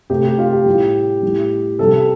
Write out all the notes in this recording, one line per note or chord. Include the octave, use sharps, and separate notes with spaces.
C3 A3 G4
G4
F4
G4
A2 G3
A2 G3
C3 G3 A4